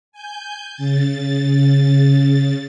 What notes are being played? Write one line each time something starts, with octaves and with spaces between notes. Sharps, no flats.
G#5 G6
C#3 A6